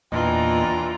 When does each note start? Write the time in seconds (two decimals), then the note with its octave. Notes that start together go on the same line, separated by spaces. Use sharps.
0.12 E2 A#2 E3 D4 F4 D#5 G5 A#5